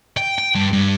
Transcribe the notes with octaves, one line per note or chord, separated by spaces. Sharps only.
G5
G5
G2
G2